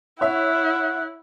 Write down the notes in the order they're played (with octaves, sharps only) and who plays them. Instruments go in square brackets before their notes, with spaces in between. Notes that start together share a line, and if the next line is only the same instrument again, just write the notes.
[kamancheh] E4 [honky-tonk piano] C#5 E5 [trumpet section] F#5